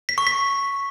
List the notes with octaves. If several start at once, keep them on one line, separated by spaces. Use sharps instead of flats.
B6
C#6
B6